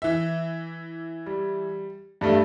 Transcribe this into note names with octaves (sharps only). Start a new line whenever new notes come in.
E3 E5
G3
G2 G3 A3